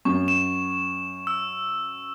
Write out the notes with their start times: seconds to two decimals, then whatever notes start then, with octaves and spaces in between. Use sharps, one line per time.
0.05 F#2 C#6
0.28 E7
1.27 E6